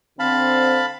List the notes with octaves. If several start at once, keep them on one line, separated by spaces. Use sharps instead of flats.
D3 C4 C5 F5 A5 B5